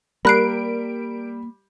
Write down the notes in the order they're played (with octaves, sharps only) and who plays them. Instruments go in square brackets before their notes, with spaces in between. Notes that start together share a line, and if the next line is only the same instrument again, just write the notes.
[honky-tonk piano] G3 [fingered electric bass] A#3 [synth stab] A#4 D7 [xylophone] B5 F#6 C7